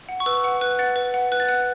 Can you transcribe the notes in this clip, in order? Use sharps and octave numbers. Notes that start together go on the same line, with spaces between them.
F#5
C#6
B4 E6
F#5
B4 F#6
F#5 A6
B4
F#5
B4 F#6
A6
F#5 F#6